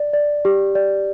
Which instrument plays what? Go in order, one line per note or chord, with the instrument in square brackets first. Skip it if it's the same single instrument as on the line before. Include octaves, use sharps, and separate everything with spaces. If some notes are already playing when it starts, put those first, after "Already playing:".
Already playing: [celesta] D5
D5
G4
D5